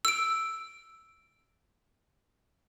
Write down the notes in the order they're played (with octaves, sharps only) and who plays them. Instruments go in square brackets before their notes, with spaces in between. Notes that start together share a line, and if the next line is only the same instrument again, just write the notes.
[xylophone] E6 D7